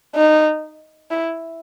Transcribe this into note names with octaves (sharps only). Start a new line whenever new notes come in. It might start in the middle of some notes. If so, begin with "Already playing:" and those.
D#4
E4